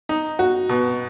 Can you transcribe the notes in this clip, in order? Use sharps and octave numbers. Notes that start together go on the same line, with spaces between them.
D#4
F#4
B2